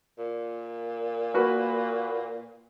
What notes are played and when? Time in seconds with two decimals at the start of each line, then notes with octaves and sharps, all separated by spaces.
0.18 A#2
1.34 A#3 F#4 B4